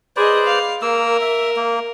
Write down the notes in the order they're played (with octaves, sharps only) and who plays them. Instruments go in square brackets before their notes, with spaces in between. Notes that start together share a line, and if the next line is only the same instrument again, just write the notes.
[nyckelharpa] G#4 D#5 [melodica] B4 C5 D5
[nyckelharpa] F5
[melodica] A#3 E6 [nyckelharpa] A#4
[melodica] E5
A#3